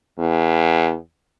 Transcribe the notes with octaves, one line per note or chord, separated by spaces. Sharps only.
E2